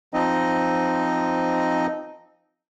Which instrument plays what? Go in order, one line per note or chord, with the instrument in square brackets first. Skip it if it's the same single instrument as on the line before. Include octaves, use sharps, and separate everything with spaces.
[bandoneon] F3 C4 D#4 D#5